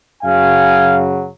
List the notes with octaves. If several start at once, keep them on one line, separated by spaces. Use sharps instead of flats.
F#2 C#3 F#3 F5 G#5